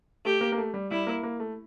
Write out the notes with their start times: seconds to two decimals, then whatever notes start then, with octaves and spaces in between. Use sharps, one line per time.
0.25 A3 G4
0.41 A#3
0.52 A#3
0.58 A3
0.74 G3
0.91 G3 E4
1.07 A#3
1.23 A#3
1.40 A3